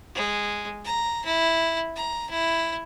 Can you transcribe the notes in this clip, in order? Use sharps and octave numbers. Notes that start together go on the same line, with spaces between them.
G#3
A#5
E4
A#5
E4